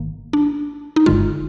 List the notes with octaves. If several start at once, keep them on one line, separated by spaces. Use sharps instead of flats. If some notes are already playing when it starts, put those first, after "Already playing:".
Already playing: G#1 G#2 D#3 A#3
D4
D#4
G1 G2 D3 G#3 F4